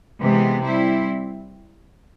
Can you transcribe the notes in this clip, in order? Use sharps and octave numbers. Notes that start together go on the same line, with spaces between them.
C3 E3 G#3 B3
G3 C4 E4